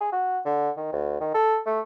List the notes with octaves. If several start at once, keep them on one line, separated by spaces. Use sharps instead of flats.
G#4
F#4
D3
D#3
D2
D#3
A4
A3